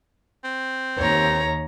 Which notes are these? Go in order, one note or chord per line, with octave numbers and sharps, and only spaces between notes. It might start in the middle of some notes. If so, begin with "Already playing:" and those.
C4
D#2 C#5 A#5